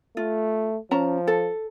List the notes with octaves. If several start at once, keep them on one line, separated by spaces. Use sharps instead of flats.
A3 F4
F3 C#4 A5 A#5
A4